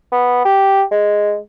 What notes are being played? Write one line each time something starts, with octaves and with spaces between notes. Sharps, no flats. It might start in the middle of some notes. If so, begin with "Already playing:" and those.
B3
G4
G#3